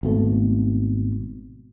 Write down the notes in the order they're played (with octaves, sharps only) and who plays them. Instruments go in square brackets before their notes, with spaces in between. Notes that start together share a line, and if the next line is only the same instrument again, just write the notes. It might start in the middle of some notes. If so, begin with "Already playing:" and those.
[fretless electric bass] G#1 B2 A3